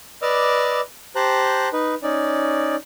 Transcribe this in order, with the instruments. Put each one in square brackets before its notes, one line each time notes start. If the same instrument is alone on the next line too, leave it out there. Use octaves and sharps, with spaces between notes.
[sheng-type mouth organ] B4 D5 D#5 D6 E6 F6
G4 C5 A5 A#5 F#6
D#4 B4
C#4 D#4 D5